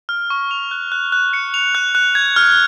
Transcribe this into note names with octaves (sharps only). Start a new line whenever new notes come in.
F6
C#6
F7
F#6
F#6
F#6
C#7
F7
F#6
F#6
G#6
F6